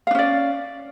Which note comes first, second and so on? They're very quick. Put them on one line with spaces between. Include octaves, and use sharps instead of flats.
F5 D4 C#4 D5